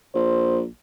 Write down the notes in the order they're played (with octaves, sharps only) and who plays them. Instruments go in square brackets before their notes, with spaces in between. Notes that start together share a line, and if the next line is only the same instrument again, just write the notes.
[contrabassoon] A#1 [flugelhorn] C5